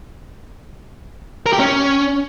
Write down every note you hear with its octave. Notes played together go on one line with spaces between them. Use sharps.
A#4
G4
C#4